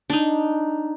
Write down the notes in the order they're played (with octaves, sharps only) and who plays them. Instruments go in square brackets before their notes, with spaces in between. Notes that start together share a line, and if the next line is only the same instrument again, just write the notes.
[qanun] D4 D#4